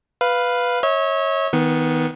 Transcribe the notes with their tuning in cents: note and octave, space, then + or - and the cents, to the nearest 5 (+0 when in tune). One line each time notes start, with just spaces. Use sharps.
B4 +0 F5 +0
C#5 -15 E5 -45
D#3 +25 B3 +0